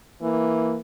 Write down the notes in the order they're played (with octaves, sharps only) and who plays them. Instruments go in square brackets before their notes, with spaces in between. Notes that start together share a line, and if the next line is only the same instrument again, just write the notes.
[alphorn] E3 [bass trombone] A#3